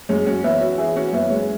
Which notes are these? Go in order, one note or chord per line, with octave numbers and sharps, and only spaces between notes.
F#2 G#3 C#4
C#4 F#4
E3 B3 E4
C#4 F#4
E3 E4 G#4
C#4 F#4
F#2 B3 E4
G#3 C#4